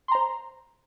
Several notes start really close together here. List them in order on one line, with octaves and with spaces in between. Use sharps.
C6 A#5 C5